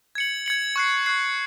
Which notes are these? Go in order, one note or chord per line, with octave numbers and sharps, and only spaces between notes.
G#6 C#7 F#7
G#6 C#7 F#7
C#6 F#6 C7
C#6 F#6 C7